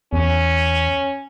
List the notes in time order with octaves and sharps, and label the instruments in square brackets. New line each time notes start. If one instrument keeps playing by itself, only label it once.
[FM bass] E2 [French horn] C#4